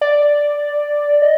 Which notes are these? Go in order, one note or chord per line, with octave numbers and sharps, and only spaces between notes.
D5
D#5